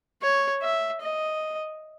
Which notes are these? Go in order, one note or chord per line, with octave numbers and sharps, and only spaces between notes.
C#5
E5
D#5